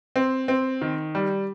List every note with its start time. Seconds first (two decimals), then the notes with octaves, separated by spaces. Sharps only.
0.16 C4
0.48 C4
0.82 D#3
1.15 G3